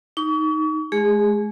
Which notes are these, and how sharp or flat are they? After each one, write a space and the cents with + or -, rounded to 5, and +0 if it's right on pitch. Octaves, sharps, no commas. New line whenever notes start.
D#4 +5 C#6 +40
G#3 +35 G#4 -25